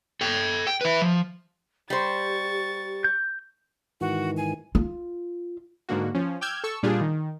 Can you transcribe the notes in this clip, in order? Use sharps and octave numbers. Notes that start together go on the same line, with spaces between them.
A4 G5
G5
E4 B4
F3
G3 G4 C5 C#6 A6
G6
G#2 D#3 E3 F#4
G#5
F4
G#2 D3 A#3 F#4
F3 C#4
G5 D6 E6 F6 G6 G#6
A4 C#6 E6
A#2 G3 D4 F4 G4 G#4
D#3